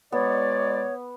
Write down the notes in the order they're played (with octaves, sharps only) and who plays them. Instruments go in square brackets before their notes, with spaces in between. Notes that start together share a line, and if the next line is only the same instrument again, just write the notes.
[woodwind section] B2 G#3 D5 [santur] B3 [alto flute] C#5